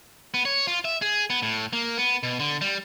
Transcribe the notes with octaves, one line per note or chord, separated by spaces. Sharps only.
B3
C#5
F4
E5
G#4
B3
A2
A#3
B3
B2
D3
G3